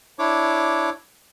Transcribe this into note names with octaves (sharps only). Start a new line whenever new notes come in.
D4 E4 C#5 D6